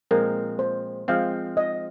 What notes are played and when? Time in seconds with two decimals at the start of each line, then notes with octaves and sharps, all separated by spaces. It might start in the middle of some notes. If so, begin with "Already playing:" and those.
0.11 A#2 F3 G#3 C4 A#4
0.59 C5
1.08 F3 G#3 C4 F5
1.57 D#5